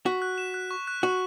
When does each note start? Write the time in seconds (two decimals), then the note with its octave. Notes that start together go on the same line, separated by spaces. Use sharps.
0.06 F#4 B6
0.22 F#6
0.38 E7
0.54 F#6
0.71 C#6
0.87 F#6
1.03 F#4 F#6